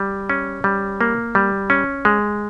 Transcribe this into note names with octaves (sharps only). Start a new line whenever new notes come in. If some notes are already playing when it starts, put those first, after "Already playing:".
Already playing: G3
C#4
G3
A#3
G3
C#4
G#3